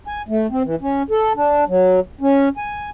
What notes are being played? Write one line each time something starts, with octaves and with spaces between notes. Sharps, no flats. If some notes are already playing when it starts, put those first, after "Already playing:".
G#5
A3
C4
E3
C#4
A4
D4
F#3
C#4
G#5